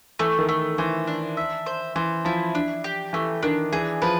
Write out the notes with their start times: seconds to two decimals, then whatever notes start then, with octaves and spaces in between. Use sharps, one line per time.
0.19 E3 A3
0.39 D#3
0.49 A3
0.78 E3 C5
1.07 D4
1.37 E5
1.66 C5
1.96 E3 C5
2.25 F3 E4
2.55 D4
2.84 G4
3.13 E3 A3
3.43 D#3 D4
3.73 E3 G#4
4.02 F3 B4